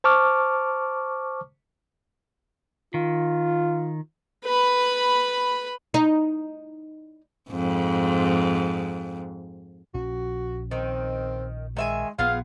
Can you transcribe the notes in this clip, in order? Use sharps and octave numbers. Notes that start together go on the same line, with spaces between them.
C5 A5 C#6 D6 F6
D#3 F4
B4 B5
D#4
F2 G#2
A#1 F3 C#4 F#4
D#3 C4
D#3 G#3 E5 G#5
A#1 B3 F4 G#4 F5